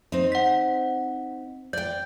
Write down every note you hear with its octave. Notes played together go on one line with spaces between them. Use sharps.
C4 D#4
F#5 B6
D5 G5 G6